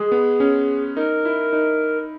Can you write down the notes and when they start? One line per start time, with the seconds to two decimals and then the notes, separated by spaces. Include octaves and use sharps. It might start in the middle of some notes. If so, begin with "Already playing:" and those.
Already playing: G#3 G#4
0.12 B3
0.40 C#4
0.96 D#4 A#4
1.25 E4
1.53 D#4